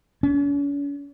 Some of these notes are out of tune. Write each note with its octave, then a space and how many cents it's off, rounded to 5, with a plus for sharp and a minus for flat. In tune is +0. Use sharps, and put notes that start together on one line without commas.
C#4 +45